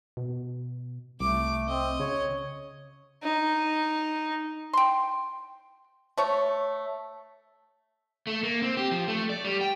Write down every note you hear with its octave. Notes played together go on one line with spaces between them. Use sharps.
B2
C2 A3 D6
C4 D#5
C#3 C#5
D#4
G5 C6
A3 C#5
A3
A#3
C4
G4
F3
A3
D5
G3
G5